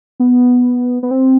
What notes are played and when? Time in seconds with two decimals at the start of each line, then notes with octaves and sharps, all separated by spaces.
0.20 B3
1.03 B3
1.11 C4